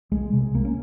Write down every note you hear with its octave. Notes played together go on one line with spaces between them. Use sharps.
C2 G#3
C3 G#3
C2 A#3
C#4